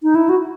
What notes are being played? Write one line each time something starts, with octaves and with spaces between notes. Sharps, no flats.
D#4
E4
F#4